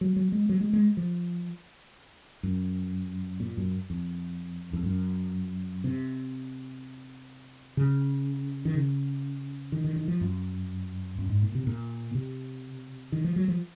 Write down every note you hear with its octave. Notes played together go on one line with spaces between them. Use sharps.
F#3
F#3
G#3
F#3
G#3
G#3
F3
F#2
A#2
F#2
F2
F2
F#2
C3
C#3
D#3
C#3
D#3
D#3
D#3
F3
F#2
F#2
G#2
A#2
C3
A#2
C3
D#3
F3
F#3
F3